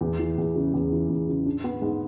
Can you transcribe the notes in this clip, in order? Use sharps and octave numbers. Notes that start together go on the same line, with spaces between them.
E2
E3
E2
C#3
E2
E3
E2
C#3
D4
B3
G#2